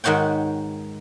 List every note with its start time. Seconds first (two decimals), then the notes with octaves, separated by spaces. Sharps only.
0.04 G#2 D#3 F#4 C#5 G5